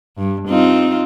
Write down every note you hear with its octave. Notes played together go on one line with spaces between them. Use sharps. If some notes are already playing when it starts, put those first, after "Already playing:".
G2
C4 D#4 F4